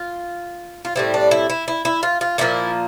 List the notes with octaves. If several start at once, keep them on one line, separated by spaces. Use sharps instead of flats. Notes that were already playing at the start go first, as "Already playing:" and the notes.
Already playing: F4
F4
A2 G3 C4 E4
D4
E4
E4
E4
E4
F4
F4
A#2 F3 A#3 E4